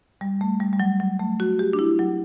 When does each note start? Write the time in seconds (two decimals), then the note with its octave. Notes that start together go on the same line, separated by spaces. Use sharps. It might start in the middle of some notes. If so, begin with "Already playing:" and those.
0.21 G3
0.41 A3
0.60 G3
0.73 G3
0.80 F#3
1.00 F#3
1.20 A3
1.40 F#4
1.59 G4
1.73 D4
1.79 E4
1.99 F#3